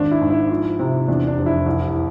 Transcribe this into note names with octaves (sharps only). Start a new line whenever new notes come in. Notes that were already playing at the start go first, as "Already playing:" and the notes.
Already playing: G#1 D4
E4
G#2
E4
F3
C3
E2 D4
D4
F1
E4
C2